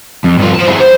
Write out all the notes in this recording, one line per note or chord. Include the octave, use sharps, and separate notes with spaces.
F2
G2 F4
C5 A5
E4 G#4
C5